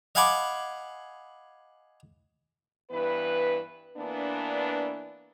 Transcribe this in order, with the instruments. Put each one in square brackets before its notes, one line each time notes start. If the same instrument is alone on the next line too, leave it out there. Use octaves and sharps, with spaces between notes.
[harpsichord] D#5 F5 F#5 G#5 B5 D6
[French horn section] G2 E3 B3 B4
E3 A#3 B3 D4